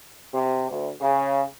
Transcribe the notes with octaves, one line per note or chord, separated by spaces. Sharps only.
C3
D2
C#3